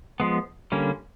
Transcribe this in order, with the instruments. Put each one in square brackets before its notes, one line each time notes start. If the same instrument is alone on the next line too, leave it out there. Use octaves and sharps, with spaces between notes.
[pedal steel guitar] F3 G#3 B3
D3 G3 A#3 C#4